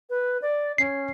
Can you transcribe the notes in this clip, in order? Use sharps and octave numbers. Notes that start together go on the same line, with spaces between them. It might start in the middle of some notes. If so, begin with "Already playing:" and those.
B4
D5
C#4 C7